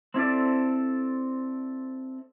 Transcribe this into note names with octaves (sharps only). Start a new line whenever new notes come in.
C4 E4 A4 D5